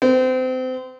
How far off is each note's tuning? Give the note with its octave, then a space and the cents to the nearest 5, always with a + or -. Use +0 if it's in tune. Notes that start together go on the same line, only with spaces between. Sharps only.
C4 -30